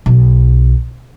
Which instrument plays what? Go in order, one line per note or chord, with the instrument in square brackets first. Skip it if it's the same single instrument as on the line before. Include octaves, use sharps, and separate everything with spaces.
[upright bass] B1